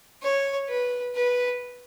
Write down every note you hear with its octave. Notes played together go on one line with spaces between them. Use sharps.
C#5
B4
B4